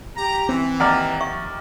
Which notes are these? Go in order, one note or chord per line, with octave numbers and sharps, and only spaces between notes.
G4 A#5
E3 C4
D#2 D5 F#5 A#5 F6
E5 C#6